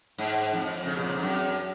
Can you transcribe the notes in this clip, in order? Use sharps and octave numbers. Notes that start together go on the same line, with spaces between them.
G#2
F2
C#3
B2
A#2
G#2
F#2